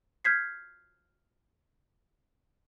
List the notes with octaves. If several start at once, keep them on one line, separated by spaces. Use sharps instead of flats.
F6 G6 G#6 B6 C7